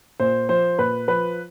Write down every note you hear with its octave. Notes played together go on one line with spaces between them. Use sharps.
A#2 C5
F3 C5
A#2 B4
F3 B4